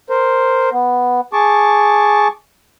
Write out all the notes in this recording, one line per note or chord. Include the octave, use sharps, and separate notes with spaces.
A#4 C5
B3
G#4 A5 C#6 D6